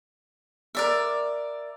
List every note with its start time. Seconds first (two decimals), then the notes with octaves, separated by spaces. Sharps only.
0.75 A#4 D5 E5